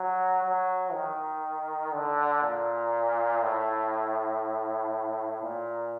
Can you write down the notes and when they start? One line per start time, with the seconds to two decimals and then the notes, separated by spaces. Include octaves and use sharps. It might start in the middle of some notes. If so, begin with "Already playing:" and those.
Already playing: F#3
0.43 F#3
0.93 D#3
1.92 D3
2.43 A#2
3.42 A2
5.42 A#2